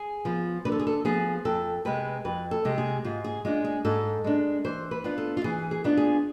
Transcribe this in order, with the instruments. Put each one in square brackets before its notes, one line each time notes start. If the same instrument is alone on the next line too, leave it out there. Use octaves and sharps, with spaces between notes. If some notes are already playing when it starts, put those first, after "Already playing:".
Already playing: [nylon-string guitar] G#4
F3 B3 F4
D3 B4
A4
G#4
A4
F3 B3 F4 G#4
F2 A4
C3 G#3 B4
F2 B4
A4
C3 G#3
G#4
G#2 F4
G#4
G#3 D4 F4
G#4
G#2 A4
G#3 D4
E3 C5
B4
B3 D4 F4
A4
F4
E3 G#4
G#4
B3 D4 F4
G#4